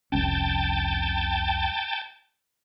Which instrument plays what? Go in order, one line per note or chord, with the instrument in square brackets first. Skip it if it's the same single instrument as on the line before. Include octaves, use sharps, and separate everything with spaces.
[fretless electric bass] F1 C2 C#4 [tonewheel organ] G5 A5